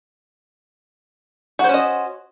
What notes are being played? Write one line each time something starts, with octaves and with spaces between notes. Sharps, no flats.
C#4 F#4 C5 D#5